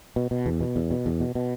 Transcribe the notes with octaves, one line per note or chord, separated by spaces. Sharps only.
B2
B2
E2
B2
E2
B2
E2
B2
B2